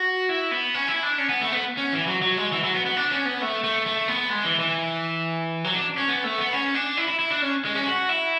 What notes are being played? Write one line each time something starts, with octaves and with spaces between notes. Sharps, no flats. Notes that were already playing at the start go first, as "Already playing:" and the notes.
Already playing: F#4
E4
B3
C#4
E4
D4
C#4
B3
A3
B3
C#4
E3
F#3
F#3
G#3
E3
F#3
B3
B3
D4
C#4
B3
A3
A3
A3
B3
G#3
E3
E3
F#3
D4
C#4
B3
A3
B3
C#4
D4
E4
E4
E4
D4
C#4
G#3
C#4
F#4
E4